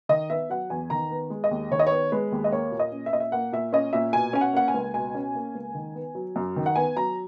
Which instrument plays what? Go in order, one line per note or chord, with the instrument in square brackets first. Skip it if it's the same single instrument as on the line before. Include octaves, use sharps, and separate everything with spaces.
[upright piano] D#3 D#5
B3 E5
F#3 F#5
E2 G#5
D#3 A#5
B3
G#3
D#5
D#2
D#3 C#5
D#5
B3 C#5
G#3 B4
D#2
D#5
A#3 C#5
A#2
D#5
C#4
E5
A#2 D#5
E5
A#3 F#5
A#2 E5
C#4 D#5
A#2 E5
B2 G#5
C#4 G#5
F#5
A#3 F#5
G#5
C#2
B2 G#5
C#4
A#3
C#2
D#3
B3
F#3
F#2
D#3
F#5
B3 G#5
F#3 A#5